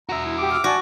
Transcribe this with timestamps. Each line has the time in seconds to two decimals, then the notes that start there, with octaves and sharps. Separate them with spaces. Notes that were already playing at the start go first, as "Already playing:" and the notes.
0.09 F#4 E5 A#5
0.26 E4
0.38 G4 D6
0.52 E6 F6
0.64 F#4 D5 G#5 A5